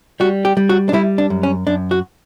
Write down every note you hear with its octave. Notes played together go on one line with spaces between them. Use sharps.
G3 F#4
G4
G3
F#4
D4
G3 E4
D4
F#2
C#4
F#2 D4
F#4